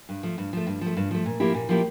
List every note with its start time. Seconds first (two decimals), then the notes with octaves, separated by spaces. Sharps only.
0.09 G2
0.23 F3 A3
0.38 G2
0.53 F3 A3
0.67 G2
0.81 F3
0.86 A3
0.97 G2
1.11 F3 A3
1.26 A#2
1.40 F3 A#3 E4 G4
1.54 A#2
1.69 F3 A#3 E4 G4